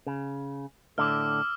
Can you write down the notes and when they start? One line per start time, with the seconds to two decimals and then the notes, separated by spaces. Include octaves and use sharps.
0.07 C#3
0.98 A2 D3 D6 E6 F6